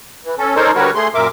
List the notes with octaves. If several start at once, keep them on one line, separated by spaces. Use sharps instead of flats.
E3
C#4 A4
D#4 A4 A#4 C5 C#5
D3 G3 F#4 A#4 B4 C#5
A3 G#4 C6
F#2 A#2 A#4 E5 D6